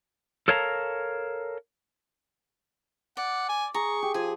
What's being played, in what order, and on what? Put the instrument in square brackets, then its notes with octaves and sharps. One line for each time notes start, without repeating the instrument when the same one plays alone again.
[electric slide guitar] A4 A#4 C#5 F5 A5 A#5
[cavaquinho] D5 [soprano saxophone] F#5
[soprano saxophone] G#5
[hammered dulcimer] G#4 [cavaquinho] A#5 [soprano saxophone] C#6
[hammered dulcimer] G4
[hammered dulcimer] F3 [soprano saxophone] G#4 [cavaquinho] G#5